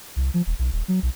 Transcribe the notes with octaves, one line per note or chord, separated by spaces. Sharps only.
C2
F3
D#1
B1
D#1
F#3
B1